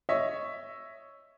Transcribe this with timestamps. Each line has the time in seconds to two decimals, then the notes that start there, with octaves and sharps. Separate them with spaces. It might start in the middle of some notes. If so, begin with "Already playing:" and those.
0.09 C#5 D#5 E5 C#6